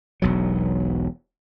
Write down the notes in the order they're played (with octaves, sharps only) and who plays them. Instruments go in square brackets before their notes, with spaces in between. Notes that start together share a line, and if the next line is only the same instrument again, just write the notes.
[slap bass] E1 B1 F#3